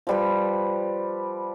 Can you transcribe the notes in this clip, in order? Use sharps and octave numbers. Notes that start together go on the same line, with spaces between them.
F3 G3 B4